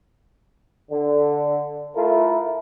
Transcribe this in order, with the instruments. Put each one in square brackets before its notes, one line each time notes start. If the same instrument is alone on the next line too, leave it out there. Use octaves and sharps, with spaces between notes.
[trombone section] D3
A3 E4 F4 A4 A#4